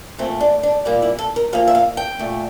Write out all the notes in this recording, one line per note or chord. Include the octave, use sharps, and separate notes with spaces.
A#2 A3 C4
D4
D4
A#2 G3 A#3
E4
A4
A#4
A#2 F3 A#3 F5
E5
F5
G5
A#2 A3